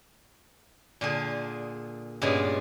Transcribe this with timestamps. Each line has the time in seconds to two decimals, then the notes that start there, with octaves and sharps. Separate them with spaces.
1.01 A#2 D3 G#4
2.22 G2 A#2 C#3 G#3 B3 G#5